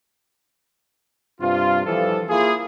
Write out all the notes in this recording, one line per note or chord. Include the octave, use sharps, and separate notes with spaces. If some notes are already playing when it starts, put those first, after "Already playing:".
G2 C3 F4
E3 F3 G3 A4
A#3 E4 F4 G#4